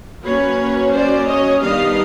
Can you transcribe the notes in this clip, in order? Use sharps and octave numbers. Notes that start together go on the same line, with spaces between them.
F#3 A#3 C#4 B4 C#5
C5 D5
C#5 D#5
D#3 G3 B3 D4 D#5 F5